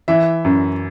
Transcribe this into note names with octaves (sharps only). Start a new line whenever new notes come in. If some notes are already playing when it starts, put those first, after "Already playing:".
E3 E5
F#2